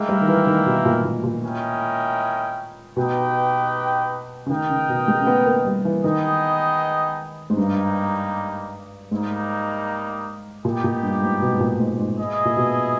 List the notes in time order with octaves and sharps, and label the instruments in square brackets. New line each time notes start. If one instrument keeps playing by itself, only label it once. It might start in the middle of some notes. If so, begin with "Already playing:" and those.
Already playing: [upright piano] G#3 [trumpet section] A#3 E4 A#4 E5 G5
[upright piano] G3
D#3
E3
D#3
B2
A#2
A#2
A#2
[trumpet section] C#4 E4 A#4 D#5 G5
[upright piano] B2 [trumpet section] D#4 G4 B4 D#5 G5
[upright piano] C#3
[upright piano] D#3 [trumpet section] D#4 A#4 D#5 G5
[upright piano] C#3
B2
G#3
C#4
B3
A#3
G3
E3
[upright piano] D#3 [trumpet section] B3 D#4 G#4 D#5 G5
[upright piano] G#2
[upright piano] G2 [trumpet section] G3 A#3 D#4
[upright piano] G#2 [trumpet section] G3 A#3 D#4
[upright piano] A#2 [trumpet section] B3 D#4 G4
[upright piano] A#2
G2
G#2
B2
G#2
A#2
G#2
G#2
[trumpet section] E4 G#4 D#5
[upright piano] A#2
B2